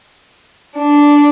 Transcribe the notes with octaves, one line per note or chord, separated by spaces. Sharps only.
D4